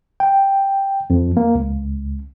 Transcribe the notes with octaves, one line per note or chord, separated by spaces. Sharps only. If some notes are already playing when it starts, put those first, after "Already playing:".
G5
F2
A#3
C#2